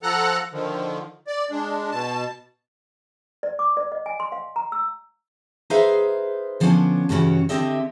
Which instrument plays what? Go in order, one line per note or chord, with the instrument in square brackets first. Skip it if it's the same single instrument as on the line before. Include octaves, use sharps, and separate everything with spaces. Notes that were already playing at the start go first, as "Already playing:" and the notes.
[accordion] F3 A4 F#5 A#5 F#6
D3 D#3 F3
D5
G#3 D4
B2 A5
[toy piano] D5
D6
D5
D#5
G#5
C6
F5
A#5
E6
[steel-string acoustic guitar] D#4 G#4 B4 C5 E5 F5
D3 F3 G3 B3 C#4 D4
G2 C#3 E3 C#4 F#4
D3 C4 G4 D#5 E5